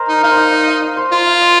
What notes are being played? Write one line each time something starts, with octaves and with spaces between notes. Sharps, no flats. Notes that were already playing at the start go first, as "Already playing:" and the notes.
Already playing: A#4 C5 D#5
D#4
D#4 F5
C5
D#5
D#5
F5
D#5
C5
F4 D#5
F5
D#5